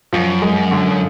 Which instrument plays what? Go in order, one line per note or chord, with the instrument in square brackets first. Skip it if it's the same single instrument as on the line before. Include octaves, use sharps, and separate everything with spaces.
[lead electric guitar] F#2 [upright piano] F3
[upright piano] G#3
D3